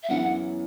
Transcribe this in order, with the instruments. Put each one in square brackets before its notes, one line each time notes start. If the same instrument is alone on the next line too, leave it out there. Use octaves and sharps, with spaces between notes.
[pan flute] E5
[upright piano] F#2 C#3 E3 B3 [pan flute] F#5